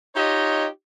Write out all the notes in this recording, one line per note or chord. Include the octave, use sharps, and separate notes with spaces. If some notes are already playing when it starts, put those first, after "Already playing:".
D#4 F4 G4 C#5 D#5